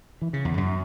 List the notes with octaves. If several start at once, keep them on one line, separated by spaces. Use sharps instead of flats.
E3
C#3
E2
F#2